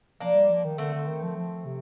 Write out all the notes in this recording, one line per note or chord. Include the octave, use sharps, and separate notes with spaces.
F3 A#3 D4
G3
F3
D#3
D3 A3 C4
D3
D#3
F3
F3
C3